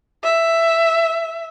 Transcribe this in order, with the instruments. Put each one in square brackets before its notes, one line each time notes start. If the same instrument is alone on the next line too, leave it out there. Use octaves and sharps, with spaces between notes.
[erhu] E5